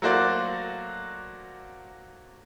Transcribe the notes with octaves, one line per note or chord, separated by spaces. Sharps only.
F#3 A3 A#3 F#4 C5 D5